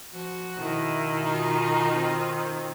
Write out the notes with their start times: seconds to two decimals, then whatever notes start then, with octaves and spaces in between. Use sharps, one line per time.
0.13 F3 F#4
0.59 B2 D#3 E4
1.23 D#4 F4 A#5
1.94 C4